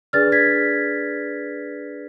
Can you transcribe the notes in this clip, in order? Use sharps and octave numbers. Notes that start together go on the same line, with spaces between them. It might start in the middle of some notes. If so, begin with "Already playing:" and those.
D4 G#4 B4 D5 F6 A6
G#6 B6